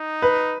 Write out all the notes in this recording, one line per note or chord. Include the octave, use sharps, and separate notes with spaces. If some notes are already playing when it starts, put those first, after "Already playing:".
Already playing: D#4
B4